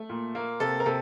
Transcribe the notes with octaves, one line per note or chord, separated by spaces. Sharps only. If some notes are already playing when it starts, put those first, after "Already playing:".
Already playing: A3
A#2
A#3
C3 A4
A#4
C3 A4